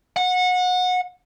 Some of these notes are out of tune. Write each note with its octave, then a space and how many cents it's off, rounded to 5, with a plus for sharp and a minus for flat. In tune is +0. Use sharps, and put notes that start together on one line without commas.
F#5 -25